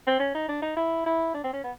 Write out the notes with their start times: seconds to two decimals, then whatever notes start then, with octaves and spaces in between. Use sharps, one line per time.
0.07 C4
0.19 C#4
0.34 D#4
0.48 D4
0.62 D#4
0.76 E4
1.06 E4
1.34 D4
1.44 C4
1.53 C#4
1.63 B3